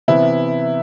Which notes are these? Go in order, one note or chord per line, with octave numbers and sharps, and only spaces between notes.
C3 E3 B3 E4